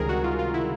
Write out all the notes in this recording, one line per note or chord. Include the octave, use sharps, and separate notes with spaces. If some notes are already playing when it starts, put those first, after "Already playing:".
Already playing: C#2 C3 D#3 G3 G#4 A#4
F#4
F4
F4
E4